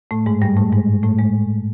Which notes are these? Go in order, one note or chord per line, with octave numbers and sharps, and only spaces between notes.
A2 A3
G#2 G#3
G2 G3
A2 A3
G#2 G#3
A2 A3
G#3